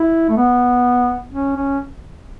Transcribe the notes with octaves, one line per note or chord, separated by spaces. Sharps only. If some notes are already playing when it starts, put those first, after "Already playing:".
Already playing: E4
A3
B3
C#4
C#4